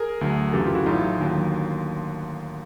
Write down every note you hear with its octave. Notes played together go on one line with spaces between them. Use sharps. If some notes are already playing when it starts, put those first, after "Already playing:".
Already playing: G#4 A#4
D2 D3 F#3
F#2 C#3 E3 G4 A4
F4 G4
E4 F#4
A1 A2 F#3 D#4 F4
D#2 D3 F#3